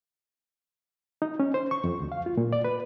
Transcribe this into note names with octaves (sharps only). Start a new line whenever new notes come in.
D#4
C#4
C5
C#6
F2
D2
F5
F4
A#2
D5
B4